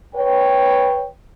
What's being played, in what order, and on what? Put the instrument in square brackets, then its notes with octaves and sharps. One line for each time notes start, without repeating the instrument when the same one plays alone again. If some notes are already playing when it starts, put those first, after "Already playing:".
[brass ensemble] B4 C#5 G5